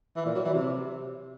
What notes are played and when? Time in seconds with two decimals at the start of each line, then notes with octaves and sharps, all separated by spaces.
0.16 E3
0.26 A#2
0.35 F#3
0.45 E3
0.54 C3